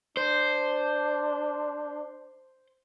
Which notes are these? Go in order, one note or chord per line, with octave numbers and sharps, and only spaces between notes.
D4 C5